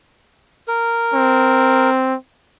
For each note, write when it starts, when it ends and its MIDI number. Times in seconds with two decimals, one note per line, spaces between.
0.68 1.90 70
1.14 2.15 60